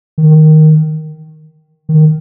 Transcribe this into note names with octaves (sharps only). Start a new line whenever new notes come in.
D#3
D#3